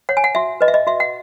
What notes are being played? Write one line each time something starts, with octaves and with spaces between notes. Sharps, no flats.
C#5 F#5
G#5
F#5
F#4 E5
B4 D#5
E5
D#5
F#4 E5
F#5